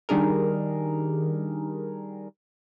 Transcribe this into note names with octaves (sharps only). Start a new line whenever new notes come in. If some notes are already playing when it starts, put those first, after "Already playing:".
D#3 G3 D4 G#4 A#4